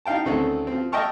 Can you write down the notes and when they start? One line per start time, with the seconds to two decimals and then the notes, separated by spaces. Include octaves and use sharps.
0.05 D#4 E4 F5 G5 A5
0.26 D2 D#3 A3 C4 C#4 A4
0.67 F3 C4
0.92 D#5 E5 G5 A5 C#6 F6